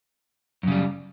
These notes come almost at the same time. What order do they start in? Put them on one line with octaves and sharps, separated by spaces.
F#2 C#3 G3